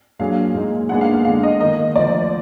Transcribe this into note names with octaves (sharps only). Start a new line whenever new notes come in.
A#2 F#3 D4 G#4 F5
A#2 G#3 D#4
A#2 G#3 B3 D4 G#4 F#5
F5
F5
D3 G#3 D4 F5
D#5
D#3 A#3 D#4 A#4 D#5
D2 D3 F3 D5